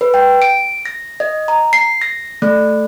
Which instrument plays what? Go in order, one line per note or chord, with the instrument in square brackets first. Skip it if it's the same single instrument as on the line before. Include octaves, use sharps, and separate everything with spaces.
[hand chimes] B4
G5
D7
A#6
D#5
A#5
C7
A#6
A3